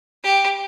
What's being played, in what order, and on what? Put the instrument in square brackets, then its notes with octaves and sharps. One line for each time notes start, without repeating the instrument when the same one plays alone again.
[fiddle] G4